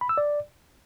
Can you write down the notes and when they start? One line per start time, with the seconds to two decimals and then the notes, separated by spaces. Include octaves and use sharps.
0.01 B5
0.09 E6
0.18 D5